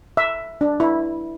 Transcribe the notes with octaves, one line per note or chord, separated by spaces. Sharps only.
E5
D4
E4